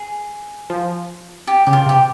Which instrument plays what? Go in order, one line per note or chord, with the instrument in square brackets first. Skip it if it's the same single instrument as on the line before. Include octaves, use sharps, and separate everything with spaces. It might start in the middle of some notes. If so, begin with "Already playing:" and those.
Already playing: [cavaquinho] G#4
[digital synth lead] F3
[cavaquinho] G4
[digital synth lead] C#3 [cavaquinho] G4
[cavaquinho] F4
[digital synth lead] C3
[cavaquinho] G4